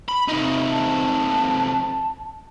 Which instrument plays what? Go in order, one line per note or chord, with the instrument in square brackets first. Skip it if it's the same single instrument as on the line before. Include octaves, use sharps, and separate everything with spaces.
[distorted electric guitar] B5
C3 D#4
[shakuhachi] A5